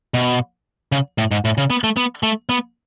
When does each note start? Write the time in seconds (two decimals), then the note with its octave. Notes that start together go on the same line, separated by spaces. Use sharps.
0.14 B2
0.92 C#3
1.18 A2
1.31 G#2
1.45 A2
1.58 C#3
1.70 B3
1.84 A3
1.97 B3
2.23 A3
2.49 B3